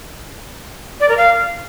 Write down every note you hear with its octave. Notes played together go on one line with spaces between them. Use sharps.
D5
A#4
F5